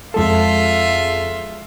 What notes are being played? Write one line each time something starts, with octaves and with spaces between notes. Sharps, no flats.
F2 G#3 F4 A4 E5